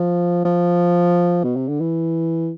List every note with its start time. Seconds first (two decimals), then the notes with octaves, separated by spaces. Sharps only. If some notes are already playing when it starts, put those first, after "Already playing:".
Already playing: F3
0.45 F3
1.44 B2
1.56 C3
1.68 D3
1.81 E3